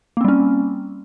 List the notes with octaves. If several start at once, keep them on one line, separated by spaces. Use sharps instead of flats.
G3 A#3 C4 C#4